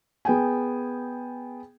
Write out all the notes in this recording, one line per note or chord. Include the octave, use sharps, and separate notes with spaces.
B3 G#4 G5 G#5